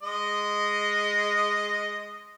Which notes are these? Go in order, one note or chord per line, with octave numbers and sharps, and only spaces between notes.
G#3 D#5